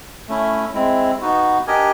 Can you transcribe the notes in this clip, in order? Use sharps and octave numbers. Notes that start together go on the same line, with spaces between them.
A3 C#4 E4
G#3 C4 E4
B3 D#4 F#4
D4 G4 A#4 D#5 G#5